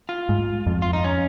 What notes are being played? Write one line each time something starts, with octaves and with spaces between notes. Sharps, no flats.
F4
G#2
F2
F4
D#4
C#4